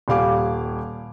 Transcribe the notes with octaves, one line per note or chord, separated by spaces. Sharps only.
D#1 G3 G4 F5 G#5 D6